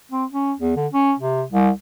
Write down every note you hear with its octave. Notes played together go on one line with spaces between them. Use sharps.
C4
C#4
E2
D3
C#4
C3
C2